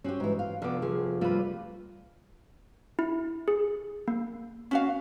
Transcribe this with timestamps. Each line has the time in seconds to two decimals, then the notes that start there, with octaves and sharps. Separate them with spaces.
0.04 C4 C#4 F#4 G4
0.20 G#2 E3
0.39 F5
0.62 F1 B3 D4 D6
0.82 F3 G#4
1.21 G3 A3 A#3 F4 B4
2.99 E4
3.48 G#4
4.08 A#3
4.71 C#4 F#4 F5